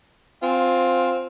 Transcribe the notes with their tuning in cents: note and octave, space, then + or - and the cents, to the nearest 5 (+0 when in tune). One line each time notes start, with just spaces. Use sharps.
C4 +0 F4 +15 G#5 +0